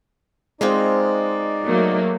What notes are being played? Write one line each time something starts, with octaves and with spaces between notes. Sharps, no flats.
G#3 C4 D#4 F4 A#4 D5
F#3 A3 A#3